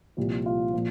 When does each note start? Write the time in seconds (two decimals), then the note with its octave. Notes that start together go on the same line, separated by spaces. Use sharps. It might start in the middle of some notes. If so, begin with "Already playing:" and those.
0.17 C2 A#2 F3
0.46 F4
0.74 A#2 F3